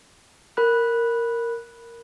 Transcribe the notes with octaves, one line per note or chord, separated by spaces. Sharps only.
A#4 B5 F#6